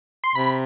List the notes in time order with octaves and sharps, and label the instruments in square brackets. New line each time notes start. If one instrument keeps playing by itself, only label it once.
[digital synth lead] C6
[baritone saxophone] C3 [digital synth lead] B5